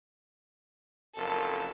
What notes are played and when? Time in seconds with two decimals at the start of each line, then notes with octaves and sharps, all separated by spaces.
1.17 F#1 F2 A4 A#4